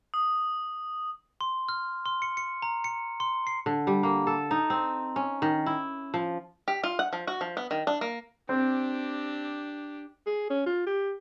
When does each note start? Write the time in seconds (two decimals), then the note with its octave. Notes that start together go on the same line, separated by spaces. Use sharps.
0.14 D#6
1.41 C6
1.69 F6
2.06 C6
2.22 C#7
2.37 C#7
2.62 A#5
2.84 C#7
3.20 C6
3.47 C7
3.66 D3
3.87 G3
4.03 A#3
4.27 A4
4.51 D#4
4.70 C4
5.16 C#4
5.42 D#3
5.66 E4
6.14 F3
6.68 G4
6.84 F4
6.99 F#5
7.13 F3
7.27 F#4
7.41 F3
7.57 B3
7.71 D#3
7.87 D4
8.01 A#3
8.49 C4 D4 G4
10.26 G#4
10.50 C#4
10.66 F4
10.86 G4